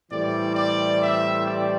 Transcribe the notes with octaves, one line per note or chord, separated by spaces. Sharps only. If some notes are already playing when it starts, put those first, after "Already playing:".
A2 E3 G3 C4 D5
D5
E5
D5